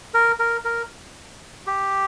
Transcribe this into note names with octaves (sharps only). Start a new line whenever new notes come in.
A#4
A#4
A#4
G4